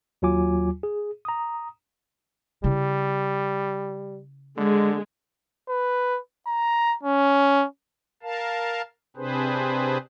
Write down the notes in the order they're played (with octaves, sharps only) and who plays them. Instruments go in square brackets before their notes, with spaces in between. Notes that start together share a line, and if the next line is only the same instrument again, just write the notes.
[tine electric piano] D#2 F#3 F4 G#5 D6
G#4
A#5 D#6
[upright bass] C#3 E4 [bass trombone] G3
[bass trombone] D3 [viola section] G#3
[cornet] B4
A#5
C#4
[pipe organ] A#4 F5 A5
C3 C4 D4 G#4 B4 C5